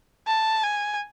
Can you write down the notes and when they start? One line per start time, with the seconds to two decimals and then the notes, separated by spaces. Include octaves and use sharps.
0.27 A5
0.63 G#5